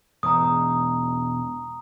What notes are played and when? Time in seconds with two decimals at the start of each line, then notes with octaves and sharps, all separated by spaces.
0.23 E1 G#2 A#5 D#6